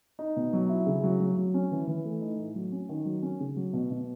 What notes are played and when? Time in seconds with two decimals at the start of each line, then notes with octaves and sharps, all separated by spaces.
0.19 D#4
0.36 B2
0.53 F#3
0.69 E4
0.87 C#3
1.03 F#3
1.20 F#3
1.37 F#3
1.54 C#4
1.71 E3
1.87 E3
2.04 A3
2.21 D#4
2.39 A2
2.55 F#3
2.72 C#4
2.89 D#3
3.05 F#3
3.22 C#4
3.40 C#3
3.56 F#3
3.73 B2
3.91 B2